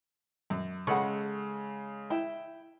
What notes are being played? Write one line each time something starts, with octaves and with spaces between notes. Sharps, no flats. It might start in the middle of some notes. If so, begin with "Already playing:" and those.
F#2
C#3 G#3 A4 D#5 F#5 B5 C#6
E4 E5 G5